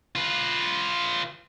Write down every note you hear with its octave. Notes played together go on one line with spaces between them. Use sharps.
F4 B4